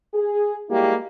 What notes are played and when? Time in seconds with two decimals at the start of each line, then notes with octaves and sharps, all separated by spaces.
0.14 G#4
0.69 G3 G#3 A#3 E4 F#4 G4